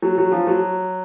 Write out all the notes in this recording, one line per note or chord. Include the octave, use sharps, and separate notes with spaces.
F#3
F#3
F3
F#3